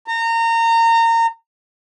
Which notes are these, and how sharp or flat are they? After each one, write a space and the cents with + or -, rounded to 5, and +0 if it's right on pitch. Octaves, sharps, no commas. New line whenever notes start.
A#5 -25